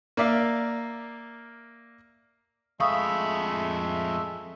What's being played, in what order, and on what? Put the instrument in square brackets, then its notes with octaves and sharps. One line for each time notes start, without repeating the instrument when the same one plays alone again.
[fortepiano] A#3 D5 E5 F5
[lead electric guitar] F2 B5 [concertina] G#3 A3 E5 [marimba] F5 C#6 D#6